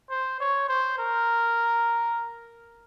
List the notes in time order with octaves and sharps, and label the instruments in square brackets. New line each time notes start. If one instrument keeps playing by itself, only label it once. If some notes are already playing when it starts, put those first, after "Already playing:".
[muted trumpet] C5
C#5
C5
A#4